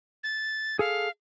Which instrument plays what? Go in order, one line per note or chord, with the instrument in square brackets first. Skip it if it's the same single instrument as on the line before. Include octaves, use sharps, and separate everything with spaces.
[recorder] A6
[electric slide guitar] G#4 A4 [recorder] F5